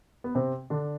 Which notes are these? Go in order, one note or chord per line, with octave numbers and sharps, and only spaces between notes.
B3
C3 C4
D3 D4